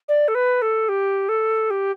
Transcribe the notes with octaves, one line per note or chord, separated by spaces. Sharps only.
D5
A4
B4
A4
G4
A4
G4